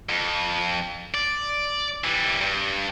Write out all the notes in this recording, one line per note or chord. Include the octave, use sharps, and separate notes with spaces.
F2
D5
E3 G3
G2